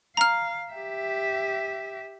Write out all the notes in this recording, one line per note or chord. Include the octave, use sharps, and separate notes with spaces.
F5 A#5 F6
G4 E5